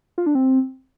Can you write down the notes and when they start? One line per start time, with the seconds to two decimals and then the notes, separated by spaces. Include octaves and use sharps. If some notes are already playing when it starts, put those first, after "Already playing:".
0.18 F4
0.26 D4
0.35 C4